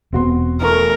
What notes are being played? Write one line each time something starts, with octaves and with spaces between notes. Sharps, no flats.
E1 B3 C4 F#4 C6
E2 A3 A#4 C#6